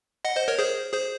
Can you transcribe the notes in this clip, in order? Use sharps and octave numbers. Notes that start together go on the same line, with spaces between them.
D#5 F#5
C5 D#5
A#4 C#5
G#4 C5
G#4 C5